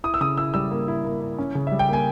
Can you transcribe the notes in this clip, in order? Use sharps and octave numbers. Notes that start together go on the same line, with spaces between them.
E4 D#6
E6
C#3 D#6
E4 E6
G3 E6
A#3
E4
A#3
E4
C#4
C#3
G3 E5
G5
A#3 G#5